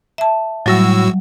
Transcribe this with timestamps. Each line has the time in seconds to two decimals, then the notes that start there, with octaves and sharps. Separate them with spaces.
0.18 E5 A5
0.66 A2 F#3 G3 F#4 E6